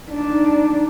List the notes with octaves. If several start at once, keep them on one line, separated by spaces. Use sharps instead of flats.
D4 D#4